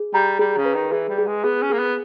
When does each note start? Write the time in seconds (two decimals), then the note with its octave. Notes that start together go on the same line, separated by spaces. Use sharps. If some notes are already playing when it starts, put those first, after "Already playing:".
Already playing: G#4
0.14 G3 A#5
0.39 G3 G#4
0.57 C#3
0.65 B4
0.74 D#3
0.92 E3 G#4
1.09 G3
1.18 G#4
1.27 G#3
1.44 B3 G#4
1.62 C#4
1.70 A#3 G#4
1.79 B3